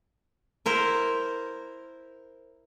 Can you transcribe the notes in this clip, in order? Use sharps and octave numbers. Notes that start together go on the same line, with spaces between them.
E4 A#4 C5